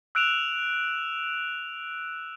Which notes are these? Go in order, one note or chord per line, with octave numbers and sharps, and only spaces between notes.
E6 F#6 D7 E7 F7